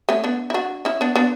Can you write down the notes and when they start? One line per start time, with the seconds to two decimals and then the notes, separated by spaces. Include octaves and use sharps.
0.09 A3 C#4
0.24 B3 D4
0.50 E4
0.54 D4 F#4
0.85 C#4 E4
1.01 B3 D4
1.16 B3 D4